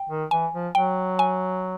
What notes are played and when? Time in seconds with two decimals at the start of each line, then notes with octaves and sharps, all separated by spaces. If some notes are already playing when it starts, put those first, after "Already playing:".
Already playing: G5
0.09 D#3
0.31 E3 G#5
0.53 F3
0.75 F#3 G5
1.19 G#5